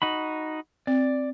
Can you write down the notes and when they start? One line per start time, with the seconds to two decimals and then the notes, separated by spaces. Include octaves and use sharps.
0.02 D#4 F#4 B5
0.87 C4 D5